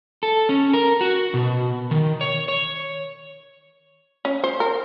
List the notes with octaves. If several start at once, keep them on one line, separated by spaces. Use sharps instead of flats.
A4
C#4
A#4
F#4
B2
D#3
C#5
C#5
C#4
C5
A#4